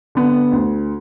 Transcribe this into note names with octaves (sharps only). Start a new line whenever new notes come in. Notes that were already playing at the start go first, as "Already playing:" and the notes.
D3 B3
D2